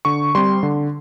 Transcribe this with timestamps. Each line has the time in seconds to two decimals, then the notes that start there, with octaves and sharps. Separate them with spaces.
0.05 D3 C#6
0.35 G3 C4 C6
0.63 D3